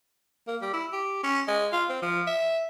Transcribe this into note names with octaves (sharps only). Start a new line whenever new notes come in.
A#3
G3
E4
G4
C#4
G#3
F4
C4
F3
E5